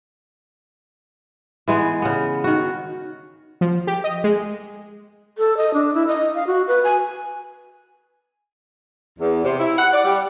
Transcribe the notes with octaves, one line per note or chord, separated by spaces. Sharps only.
E3 G#3 B3
C#3 B3
D#3 F#4
F3
G4
D#5
G#3
A4
D#5
D4
E4
D#5
F5
F#4
B4
G#5
E2
C3
E4
F#5
D5
G3